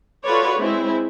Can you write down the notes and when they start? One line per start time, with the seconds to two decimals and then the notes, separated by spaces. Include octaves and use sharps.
0.24 F4 F#4 A4 B4 C#5 D5
0.59 G#3 C4 E4